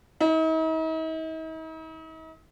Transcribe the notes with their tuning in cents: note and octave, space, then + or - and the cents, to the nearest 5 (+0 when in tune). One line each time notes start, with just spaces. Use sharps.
D#4 +45